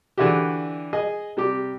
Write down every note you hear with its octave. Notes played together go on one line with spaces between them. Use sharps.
D3 E3 D4 E4 F#4 G4
G#4 D#5
C3 G3 G4 D6